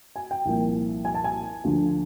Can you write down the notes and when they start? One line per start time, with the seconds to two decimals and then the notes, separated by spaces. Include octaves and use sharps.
0.16 G#5
0.31 G5
0.45 C2 A#2 F3 A#3
1.05 G#5
1.15 A5
1.24 G#5
1.64 D2 D3 F3